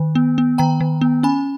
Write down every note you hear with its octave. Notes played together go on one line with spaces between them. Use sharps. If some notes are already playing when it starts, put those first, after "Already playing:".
Already playing: D#3
B3
B3
D#3 G5 A#5
D#3
B3
C#4 G#5 B5